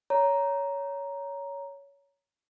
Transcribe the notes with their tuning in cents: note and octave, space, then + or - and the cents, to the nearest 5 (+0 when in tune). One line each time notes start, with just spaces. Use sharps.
C#5 +15 A#5 +5